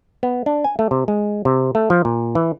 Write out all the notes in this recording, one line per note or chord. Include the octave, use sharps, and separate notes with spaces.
B3
D4
G#5
A3
C3
G#3
C3
A3
F3
A#2
E3